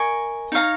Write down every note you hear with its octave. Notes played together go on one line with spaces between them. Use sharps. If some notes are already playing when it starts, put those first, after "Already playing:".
Already playing: A#4 D#5 G#5 C#6
D#4 C#5 F5 A#5